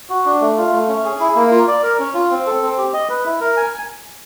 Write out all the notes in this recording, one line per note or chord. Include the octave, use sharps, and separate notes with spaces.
F#4
D4
A3
F4
A3
C#4
G#4
E4
A#3
F4
D5
A#4
C#4
F4
C4
A4
C4
G4
D#5
B4
E4
A#4
G#5